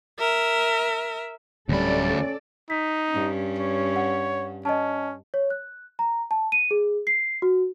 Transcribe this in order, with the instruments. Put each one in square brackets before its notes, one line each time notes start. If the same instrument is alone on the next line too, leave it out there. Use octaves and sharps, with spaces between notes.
[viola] A#4 E5
[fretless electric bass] D1 G3 [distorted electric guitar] D2 B5 [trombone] C#4 [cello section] A4 D5
[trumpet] D#4 [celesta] B6
[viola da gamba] G2 C#4
[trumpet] C#5
[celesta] F#5
[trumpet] C#4 [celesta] D#5 A5
[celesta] C#5
F#6
A#5
A5
D#7
G#4
C7
F#4